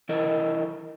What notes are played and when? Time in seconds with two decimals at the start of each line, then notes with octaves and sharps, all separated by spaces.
0.09 E3 E4 A4 A#4 D#5